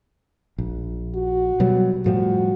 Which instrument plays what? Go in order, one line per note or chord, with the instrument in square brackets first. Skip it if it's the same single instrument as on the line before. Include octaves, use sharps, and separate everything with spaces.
[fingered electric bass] A#1
[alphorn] F#4
[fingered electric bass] B2 F#3 G3
[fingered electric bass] A2 F3 G3 [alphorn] F#4